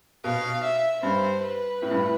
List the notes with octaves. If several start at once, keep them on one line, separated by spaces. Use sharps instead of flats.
B2 F5
E5
G2 C5
B4
A2
G2
A2